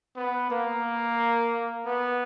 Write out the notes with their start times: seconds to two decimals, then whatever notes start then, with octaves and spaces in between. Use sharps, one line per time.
0.16 B3
0.51 A#3
1.87 B3